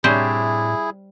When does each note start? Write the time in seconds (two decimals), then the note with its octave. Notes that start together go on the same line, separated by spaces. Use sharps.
0.04 A2 C3 G3 D4 E4 G#4 C5 C#5